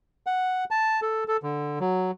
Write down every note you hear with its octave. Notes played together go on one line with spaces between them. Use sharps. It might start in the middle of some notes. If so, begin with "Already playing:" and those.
F#5
A5
A4
A4
D3
F#3